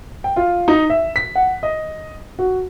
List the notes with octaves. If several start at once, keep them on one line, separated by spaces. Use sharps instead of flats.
G5
F4
D#4
E5
B6
F#5
D#5
F#4